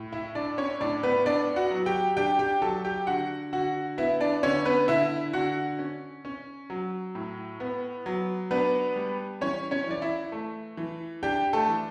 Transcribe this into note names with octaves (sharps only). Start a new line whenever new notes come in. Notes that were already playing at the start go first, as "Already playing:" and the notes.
Already playing: A2
E4 E5
D4 D5
C#4 C#5
A2 D4 D5
B3 B4
B3 D4 D5
F#4 F#5
F#3
G4 G5
D4 G4 G5
G4 G5
F#3 A4 A5
G4 G5
D3 F#4 F#5
D3 F#4 F#5
B3 E4 E5
D4 D5
D3 C#4 C#5
B3 B4
D3 E4 E5
D3 F#4 F#5
C#4
C#4
F#3
A2
B3
F#3
B3 D4 B4
G3
E3 C#4 C#5
C#4 C#5
E3 D5
E4 E5
A3
E3
D4 G4 G5
A3 A4
E3